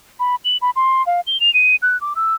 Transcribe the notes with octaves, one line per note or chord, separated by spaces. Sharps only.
B5
F#7
B5
C6
F5
G7
F7
D#7
F#6
D6
E6